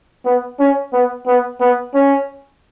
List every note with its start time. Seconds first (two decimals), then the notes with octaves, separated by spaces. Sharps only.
0.25 B3
0.59 C#4
0.93 B3
1.26 B3
1.60 B3
1.94 C#4